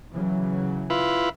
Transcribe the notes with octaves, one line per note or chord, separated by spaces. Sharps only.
C#3 E3 F#3
E4 F4 B4